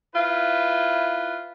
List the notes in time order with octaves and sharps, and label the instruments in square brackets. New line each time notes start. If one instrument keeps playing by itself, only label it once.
[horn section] E4 F4 B4